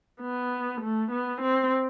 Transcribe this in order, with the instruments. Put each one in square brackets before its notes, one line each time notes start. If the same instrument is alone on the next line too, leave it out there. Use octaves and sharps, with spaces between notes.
[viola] B3
A3
B3
C4